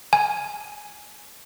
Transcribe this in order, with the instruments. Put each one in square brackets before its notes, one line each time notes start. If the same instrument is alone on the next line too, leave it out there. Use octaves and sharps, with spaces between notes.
[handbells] G#5